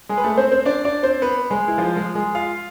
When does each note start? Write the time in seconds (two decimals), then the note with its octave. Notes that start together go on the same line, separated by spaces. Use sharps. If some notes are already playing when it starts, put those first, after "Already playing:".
0.09 G#3 G#4
0.18 B4
0.24 A3 A4
0.37 C4 C5
0.52 C4 C5
0.65 D4 D5
0.85 D4 D5
1.03 C4 C5
1.22 B3 B4
1.50 G#3 G#4
1.68 E4
1.78 F3 F4
1.96 G#3 G#4
2.15 G#3 G#4
2.35 F4 F5